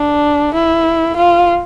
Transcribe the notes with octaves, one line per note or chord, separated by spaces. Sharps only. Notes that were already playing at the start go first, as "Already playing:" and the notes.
Already playing: D4
E4
F4